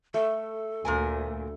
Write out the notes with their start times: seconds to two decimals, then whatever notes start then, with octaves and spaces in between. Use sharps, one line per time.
0.14 A3 A4
0.85 D2 A#2 A#4 G#5